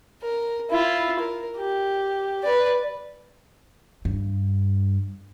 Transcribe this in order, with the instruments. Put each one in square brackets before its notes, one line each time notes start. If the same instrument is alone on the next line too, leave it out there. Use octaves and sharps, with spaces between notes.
[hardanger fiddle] A#4
E4 F4
A#4
G4
B4 D5
[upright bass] G2